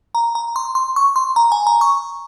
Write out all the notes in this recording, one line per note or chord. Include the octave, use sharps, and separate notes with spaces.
A#5
A#5
C6
C6
C#6
C6
A#5
G#5
A#5
C#6